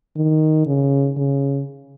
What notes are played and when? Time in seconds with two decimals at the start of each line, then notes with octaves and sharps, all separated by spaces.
0.16 D#3
0.66 C#3
1.17 C#3